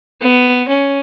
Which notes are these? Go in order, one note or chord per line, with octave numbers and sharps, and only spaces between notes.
B3
C#4